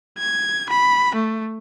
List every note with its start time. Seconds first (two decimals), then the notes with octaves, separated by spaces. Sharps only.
0.18 G#6
0.69 B5
1.15 A3